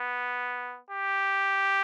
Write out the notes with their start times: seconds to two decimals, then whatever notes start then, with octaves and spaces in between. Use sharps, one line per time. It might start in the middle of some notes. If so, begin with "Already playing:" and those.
Already playing: B3
0.90 G4